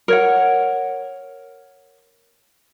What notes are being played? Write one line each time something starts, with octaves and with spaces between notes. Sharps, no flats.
A#4 C#5 F#5